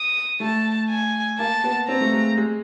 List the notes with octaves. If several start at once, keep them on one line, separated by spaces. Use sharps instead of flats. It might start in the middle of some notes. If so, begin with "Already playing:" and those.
Already playing: D#6
A3 A5
G#5
A#3 A5
B3
C4 A#5
A3
G#3
G#3